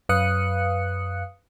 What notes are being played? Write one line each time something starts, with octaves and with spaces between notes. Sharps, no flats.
F#2 B4 F5 D#6 F#6 C#7